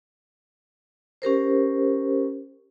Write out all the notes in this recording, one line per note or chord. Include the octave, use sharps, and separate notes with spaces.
C#4 G4 A#4 C5